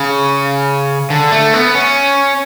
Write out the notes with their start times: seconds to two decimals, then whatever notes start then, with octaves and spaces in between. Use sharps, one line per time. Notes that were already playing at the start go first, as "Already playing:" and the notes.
Already playing: C#3
1.10 D3
1.32 A3
1.54 B3
1.75 C#4